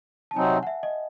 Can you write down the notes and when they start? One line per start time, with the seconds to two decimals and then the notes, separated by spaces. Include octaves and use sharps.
0.31 A5
0.36 C3 F#3 C4 D#4 G#5
0.63 F#5
0.67 E5
0.83 D#5